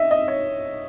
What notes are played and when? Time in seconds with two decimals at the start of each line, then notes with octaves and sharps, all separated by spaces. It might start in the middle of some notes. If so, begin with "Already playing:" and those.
Already playing: D#5 E5
0.11 D#5
0.28 C#5